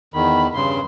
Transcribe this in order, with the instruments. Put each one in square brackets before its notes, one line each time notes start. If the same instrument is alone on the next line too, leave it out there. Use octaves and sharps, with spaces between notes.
[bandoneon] E2 D#3 [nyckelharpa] B5
[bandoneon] G2 C#3 [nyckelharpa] C6